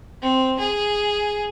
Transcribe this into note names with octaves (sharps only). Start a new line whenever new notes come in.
C4
G#4